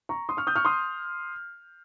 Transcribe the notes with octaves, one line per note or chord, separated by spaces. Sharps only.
A#5 C#6
C6 D#6
C#6 F6
D#6 G6
C#6 F6
C6 D#6